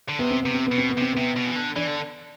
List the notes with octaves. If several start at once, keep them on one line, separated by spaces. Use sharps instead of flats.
D3
C3 B3
C4
C3 B3
C4
B3
B2
C4
B3
C3 C4
C3 B3
B2
E3
D3
E3 D4
D3